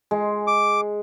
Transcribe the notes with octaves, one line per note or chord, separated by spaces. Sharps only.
G#3
D6